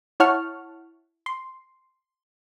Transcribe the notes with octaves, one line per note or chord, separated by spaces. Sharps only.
E4 C#5 F#5 A5 C#6 F6
C6